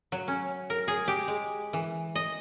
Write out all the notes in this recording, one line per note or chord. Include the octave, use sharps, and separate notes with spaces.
F#3
C#4
A#4
G#4
G4
G#3
E3
D#5